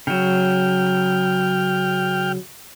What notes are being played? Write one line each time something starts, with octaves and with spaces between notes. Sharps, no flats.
C#3 F#3 G5 F6